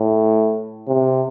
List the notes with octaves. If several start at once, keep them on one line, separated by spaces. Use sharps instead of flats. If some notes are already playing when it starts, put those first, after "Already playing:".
Already playing: A2
C3